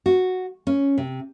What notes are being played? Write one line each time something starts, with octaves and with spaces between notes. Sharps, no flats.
F#4
C#4
C3